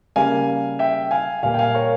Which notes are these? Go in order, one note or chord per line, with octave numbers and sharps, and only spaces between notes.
C#3 G3 A#3 F5 G#5
E5 G5
F5 G#5
A#2 G3 A#3 F5 G#5
G5
F5 G#5
A#4 C#5